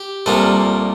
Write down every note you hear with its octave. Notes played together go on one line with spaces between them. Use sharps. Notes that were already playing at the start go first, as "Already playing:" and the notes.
Already playing: G4
C2 A#2 G3 A#3 A4